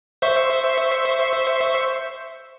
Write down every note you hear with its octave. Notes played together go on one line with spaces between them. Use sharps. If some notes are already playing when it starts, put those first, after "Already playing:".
C5 E5 C#6